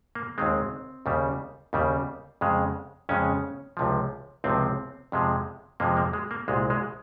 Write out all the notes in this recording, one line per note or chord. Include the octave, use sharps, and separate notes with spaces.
A#3
D#2 D#3 G#3 C4
D#2 C#3 G3
D#2 C#3 G3
F2 C#3 G#3
F2 C#3 G#3 C#4
C#2 C3 F3
C#2 C3 F3 C4
F2 C3 F3 G#3
F2 C3 F3 G#3 A#3
A#3
G#3
A#3
C2 A#2 G#3
G#3